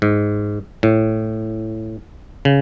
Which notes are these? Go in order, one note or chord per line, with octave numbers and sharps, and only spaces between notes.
G#2
A2
C#3